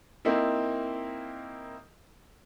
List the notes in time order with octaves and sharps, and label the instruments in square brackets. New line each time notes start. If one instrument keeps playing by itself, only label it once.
[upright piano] A#3 C4 D#4 E4